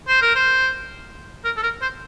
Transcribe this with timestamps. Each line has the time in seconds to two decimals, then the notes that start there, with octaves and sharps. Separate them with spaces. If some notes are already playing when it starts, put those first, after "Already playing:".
0.08 C5
0.21 A#4
0.35 C5
1.44 A#4
1.56 A4
1.63 A#4
1.81 C5